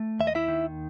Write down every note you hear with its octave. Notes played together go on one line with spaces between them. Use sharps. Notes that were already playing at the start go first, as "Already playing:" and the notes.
Already playing: A3
D#2 E5
D#5
E4 E5
D#3